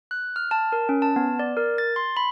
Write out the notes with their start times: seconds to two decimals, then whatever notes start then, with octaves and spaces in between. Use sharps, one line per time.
0.11 F#6
0.36 F6
0.51 A5
0.72 A#4
0.89 C#4
1.02 A5
1.16 B3
1.39 D5
1.57 A#4
1.78 A6
1.96 C6
2.17 B5